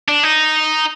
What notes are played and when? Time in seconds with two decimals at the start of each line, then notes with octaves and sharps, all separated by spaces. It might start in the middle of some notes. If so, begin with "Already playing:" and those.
0.08 D4
0.23 D#4